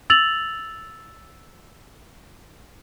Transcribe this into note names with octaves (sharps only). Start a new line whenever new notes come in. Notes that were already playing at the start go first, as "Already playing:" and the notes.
E6 A6 F7 F#7